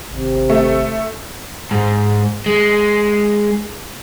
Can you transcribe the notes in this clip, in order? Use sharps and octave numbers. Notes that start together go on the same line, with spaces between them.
G#1 C3
A3
G#2
G#3